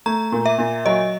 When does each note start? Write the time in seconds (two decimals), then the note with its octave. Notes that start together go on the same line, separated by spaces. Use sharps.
0.06 A3 A#5
0.32 A#2
0.46 E5
0.58 A#2
0.86 F#3 D#5